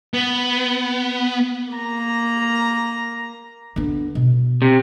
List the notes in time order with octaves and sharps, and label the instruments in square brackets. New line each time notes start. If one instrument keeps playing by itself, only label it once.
[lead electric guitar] B3
[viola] A#3 A#5
[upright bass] D3 B3
B2
[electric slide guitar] C3